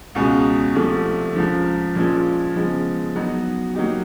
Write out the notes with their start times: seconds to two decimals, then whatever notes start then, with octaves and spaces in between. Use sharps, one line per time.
0.15 C#2 B2 G#3 C#4 F#4
0.75 C2 C3 F3 A3
1.36 C#2 C#3 F3
1.95 A#2 F3 G#3 C#4 F4
2.55 C#3 F3 G#3 B3
3.15 F#3 B3 D#4 F#4
3.75 F#3 A#3 D#4 G4